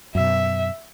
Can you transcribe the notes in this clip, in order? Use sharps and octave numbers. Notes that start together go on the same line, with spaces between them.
F#2 B2 E5